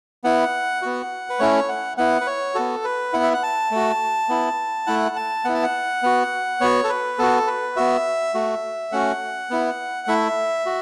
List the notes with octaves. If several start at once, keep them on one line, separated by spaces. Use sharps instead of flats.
B3 E4 F#5
B3 F#4
B4
A3 C#4 E4 C#5
F#5
B3 E4 F#5
B4
C#5
B3 F#4 A4
B4
B3 E4 F#5
E5
F#5
A5
A3 F#4
B3 E4
A3 E4 F#5
A5
B3 E4 F#5
A5
F#5
B3 F#4
B3 F#4 C#5
A4
B4
B3 F#4 A4
B4
B3 F#4 E5
A3 F#4
A3 C#4 F#4 F#5
B3 E4
A3 E4 E5
F#4